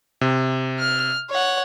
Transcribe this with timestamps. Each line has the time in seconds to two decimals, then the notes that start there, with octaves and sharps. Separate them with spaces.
0.21 C3
0.79 F6
1.30 C#5 F#5